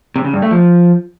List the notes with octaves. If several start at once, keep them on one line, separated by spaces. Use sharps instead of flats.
C3
C#3
G2
A3
F3